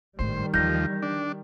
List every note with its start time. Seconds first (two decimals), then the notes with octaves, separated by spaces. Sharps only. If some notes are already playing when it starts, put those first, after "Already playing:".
0.19 G#1 A2 D#3 G3 C5
0.54 D#2 D3 E3 F3 G6 A#6
1.03 D4